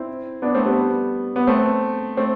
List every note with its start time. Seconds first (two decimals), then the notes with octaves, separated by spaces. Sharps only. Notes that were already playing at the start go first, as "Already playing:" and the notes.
Already playing: C4 E4
0.42 B3 D4
0.54 A3 C4
0.65 G3 B3
1.36 B3
1.47 A3 C4
2.17 A3 C4